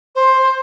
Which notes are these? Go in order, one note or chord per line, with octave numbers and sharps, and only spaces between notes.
C5